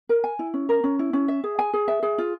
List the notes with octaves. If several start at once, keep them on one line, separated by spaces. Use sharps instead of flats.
A#4
G#5
E4
C#4
A#4
C#4
E4
C#4
E5
G#4
G#5
G#4
E5
G#4
F4